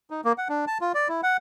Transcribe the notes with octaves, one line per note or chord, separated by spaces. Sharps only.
D#4
A#3
F#5
D4
A5
F4
D5
E4
F#5